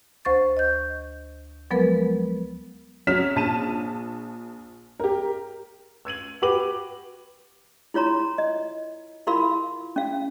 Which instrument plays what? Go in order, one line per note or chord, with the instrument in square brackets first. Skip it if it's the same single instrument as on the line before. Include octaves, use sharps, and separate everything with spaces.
[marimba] D2 C5 C#6 A6
D#5 G6
F3 F#3 G#3 B3 A#4 B4
[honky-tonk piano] F#3 C#4 F6 B6 E7
A#1 A5 D#7 E7
G4 A#4
[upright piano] E6 G#6 D#7 F#7
F#4 G4 B4 D6 D#7 F#7
[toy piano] E4 F4 C#5 A#5 C6
D#5
E4 F4 A#4 F5 B5 C6
C#4 F5